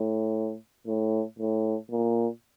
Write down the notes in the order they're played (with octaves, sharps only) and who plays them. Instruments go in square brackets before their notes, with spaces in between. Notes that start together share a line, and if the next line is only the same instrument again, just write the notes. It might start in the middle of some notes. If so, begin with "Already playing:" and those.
Already playing: [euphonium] A2
A2
A2
A#2